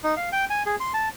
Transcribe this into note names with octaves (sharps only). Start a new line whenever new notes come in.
D#4
F5
G5
G#5
G#4
C6
A5